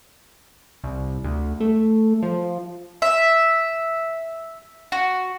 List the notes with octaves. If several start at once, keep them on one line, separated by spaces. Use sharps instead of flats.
C2
D2
A3
F3
E5
F#4